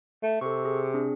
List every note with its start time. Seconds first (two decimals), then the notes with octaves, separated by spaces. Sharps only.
0.23 A3
0.41 C3 A4 C#6
0.65 G#4
0.94 C4 D4 G#4